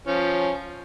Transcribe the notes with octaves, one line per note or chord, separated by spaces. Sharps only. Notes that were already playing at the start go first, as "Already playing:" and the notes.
F3 C#4